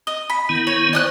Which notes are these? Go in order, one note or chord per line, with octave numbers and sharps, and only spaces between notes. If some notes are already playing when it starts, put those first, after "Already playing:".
D#5
B5
D#3 B3 E4
C#5
C5 D5 D#6 F#6